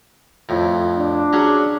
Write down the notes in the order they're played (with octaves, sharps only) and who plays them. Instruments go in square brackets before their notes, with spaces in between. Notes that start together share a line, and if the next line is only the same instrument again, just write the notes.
[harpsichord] F2 A2
[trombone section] D4
[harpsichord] F#3 C#4 G#4